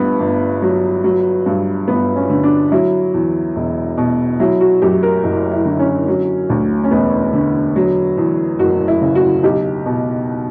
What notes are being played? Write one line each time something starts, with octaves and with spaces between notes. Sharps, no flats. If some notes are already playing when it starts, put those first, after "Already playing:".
Already playing: G1 G2 B3
G1
F#3
F#3
G2
G1 B3
C#4
D3
D4
F#3 E4
E2
E1
B2
F#3 E4
F#4
F#2 G4
A#4
F#1
E4
D3
C#4
F#3
D2
C#4
E1 B3
D3
F#3
E2
F#1 F#4
E4
C#3
F#4
B1 G4
B2